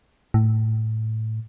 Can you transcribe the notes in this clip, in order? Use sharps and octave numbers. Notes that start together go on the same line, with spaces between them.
A2